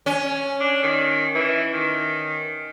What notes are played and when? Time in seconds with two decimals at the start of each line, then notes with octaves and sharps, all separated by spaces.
0.06 C#4
0.61 D4
0.83 D#3
1.35 E3
1.74 D#3